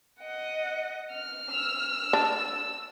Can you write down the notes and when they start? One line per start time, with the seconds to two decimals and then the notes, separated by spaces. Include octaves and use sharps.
0.20 D#5 F#5
1.13 F6
1.53 E6
2.13 D4